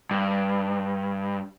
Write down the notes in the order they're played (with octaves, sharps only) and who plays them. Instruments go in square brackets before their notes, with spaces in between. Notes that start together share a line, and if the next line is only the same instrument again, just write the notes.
[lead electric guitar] G2